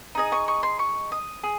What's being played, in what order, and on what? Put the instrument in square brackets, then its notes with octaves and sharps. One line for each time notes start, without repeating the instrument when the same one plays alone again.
[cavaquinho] D#4 G#4 D#5
C#6
C#6
C6
C#6
D#6
G#4